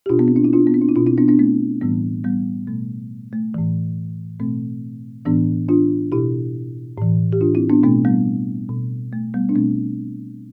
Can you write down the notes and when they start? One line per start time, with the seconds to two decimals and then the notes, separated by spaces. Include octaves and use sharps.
0.06 G4
0.09 B2 D4 F4
0.19 B3
0.28 C4
0.36 D4
0.44 E4
0.53 D4 F4
0.67 B3
0.74 C4
0.82 D4
0.89 E4
0.95 B2 D4 F4
1.07 C4 E4
1.17 B3 D4
1.28 B3 D4
1.39 A3 C4
1.82 A2 E3 G3 B3
2.24 G3 B3
2.67 B2 A3
3.33 A3
3.54 A2 E3
4.40 B2 A3 C4
5.25 A2 E3 B3 D4
5.69 D4 F4
6.12 B2 E4 G4
6.98 A2 E3
7.33 G4
7.41 D4 F4
7.55 C4 E4
7.69 B3 D4
7.83 B2 A3 C4
8.05 G3 B3
8.69 B2
9.13 A3
9.34 G3 B3
9.49 D4
9.55 B2 A3 C4